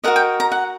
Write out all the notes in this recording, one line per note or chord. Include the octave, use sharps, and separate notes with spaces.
F#4 A#4 D#5 F#5
G5
A#5
F#5